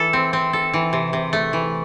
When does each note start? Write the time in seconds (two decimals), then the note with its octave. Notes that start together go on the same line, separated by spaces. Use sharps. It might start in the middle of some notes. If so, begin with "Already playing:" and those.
Already playing: E3 A4
0.13 C4
0.33 C4
0.53 A4
0.73 E3
0.93 C3
1.13 C3
1.33 A3
1.53 E3